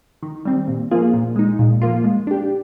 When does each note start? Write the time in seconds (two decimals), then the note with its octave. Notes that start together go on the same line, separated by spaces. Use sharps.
0.23 D#3
0.45 G3 C4
0.68 A#2
0.91 F3 A#3 F4 G#4
1.14 A#2
1.36 G#3 D#4
1.59 A#2
1.81 F3 A#3 F4
2.04 G#3
2.27 D4 G4